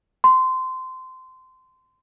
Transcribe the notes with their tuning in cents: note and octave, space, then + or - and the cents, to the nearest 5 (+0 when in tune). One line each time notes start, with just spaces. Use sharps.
C6 -20